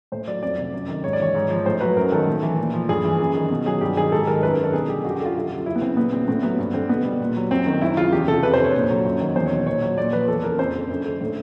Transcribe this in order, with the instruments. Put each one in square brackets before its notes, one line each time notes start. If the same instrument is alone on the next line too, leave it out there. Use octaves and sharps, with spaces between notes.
[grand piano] A2 C5
F#3 D5
F2 D5
C3
F#2
D#3
G#2 C#5
D5
E3 C#5
G#2
F3
A2 C5
F#3 B4
F#2 A#4
D#3 A4
A2
E3
A#2
F3
G2 G#4
E3
F#2
D#3
B2
F#3 G#4
G2 G4
D#3 G#4
G#2 A4
D#3 A#4
F#2 B4
A#4
D3
A4
B2 G#4
G3 G4
F#2 F#4
G4
F#4
D3
F4
F#2
C#3
F#2 E4
B3
C#3 C4
A#2 B3
G3 C4
A2 C4
F#3 B3
G2
D3 C4
B2 B3
G3
A#2
F#3
F#2 C4
D#3
F#2 E4
C#3 F4
E2 G4
C3 A4
F2 B4
C5
D3
C#5
A#2
F#3
F#2
D#3
E2 C5
C#5
B2
A#2 C#5
F#3 C#5
A#2 D5
F3 B4
E2 A4
C#3 A#4
F2 C5
D3
F#2
D3
A2